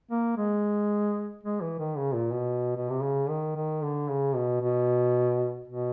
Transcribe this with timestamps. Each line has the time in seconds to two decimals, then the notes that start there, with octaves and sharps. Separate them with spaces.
0.11 A#3
0.37 G#3
1.44 G#3
1.61 E3
1.79 D#3
1.97 C#3
2.14 A#2
2.32 B2
2.76 B2
2.89 C3
3.03 C#3
3.29 D#3
3.56 D#3
3.82 D3
4.09 C#3
4.35 B2
4.62 B2
5.68 B2